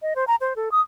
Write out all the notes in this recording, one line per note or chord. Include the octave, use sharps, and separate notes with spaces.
D#5
C5
A#5
C5
A4
D#6